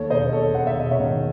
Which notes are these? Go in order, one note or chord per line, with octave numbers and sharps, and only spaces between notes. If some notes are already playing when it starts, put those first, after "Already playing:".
Already playing: D#2 A4 C#5
E1 C5 D#5
D#2 A4 C#5
D#2 F#5
E5
E1 D#5
C#5 E5
D#3